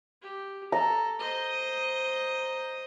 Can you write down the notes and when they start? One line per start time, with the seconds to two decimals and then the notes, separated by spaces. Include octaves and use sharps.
0.22 G4
0.72 A4 A#5
1.19 C5 D#5